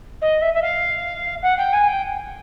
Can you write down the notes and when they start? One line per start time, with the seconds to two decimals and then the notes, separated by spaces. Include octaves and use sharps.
0.22 D#5
0.42 E5
0.54 E5
0.62 F5
1.42 F#5
1.58 G5
1.73 G#5
1.88 G5